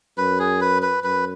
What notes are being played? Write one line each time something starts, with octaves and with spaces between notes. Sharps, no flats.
F#2 B4
G#4
B4
B4
F#2 B4